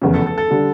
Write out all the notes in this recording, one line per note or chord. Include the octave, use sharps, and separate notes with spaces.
F1 E2 C#3
A4
A4
A4
D3 G3